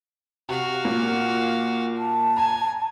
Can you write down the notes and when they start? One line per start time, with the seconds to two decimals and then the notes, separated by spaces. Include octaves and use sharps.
0.49 C3 F#4 F5
0.85 A#2
1.98 A5
2.37 G#5 A#5